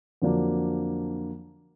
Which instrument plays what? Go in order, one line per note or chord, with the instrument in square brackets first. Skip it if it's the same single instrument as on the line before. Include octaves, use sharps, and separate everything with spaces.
[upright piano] F2 D3 F#3 A#3 D4